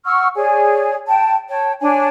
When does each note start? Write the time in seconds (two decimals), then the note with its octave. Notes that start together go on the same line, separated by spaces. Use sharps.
0.05 F#5 C#6 E6 F6
0.35 G#4 C#5 D5 G#5
1.07 G5 A5
1.49 C#5 G5 A5
1.80 D4 C#5 G#5